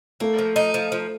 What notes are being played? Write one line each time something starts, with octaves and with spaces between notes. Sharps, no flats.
A3 A#3
F3
D#4
F3
F3